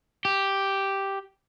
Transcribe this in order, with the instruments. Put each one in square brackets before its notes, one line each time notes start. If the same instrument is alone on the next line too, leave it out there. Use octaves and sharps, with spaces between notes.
[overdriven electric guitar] G4